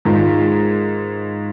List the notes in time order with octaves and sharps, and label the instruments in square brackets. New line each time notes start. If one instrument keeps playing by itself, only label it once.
[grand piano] G#2 D#3 G#3 F4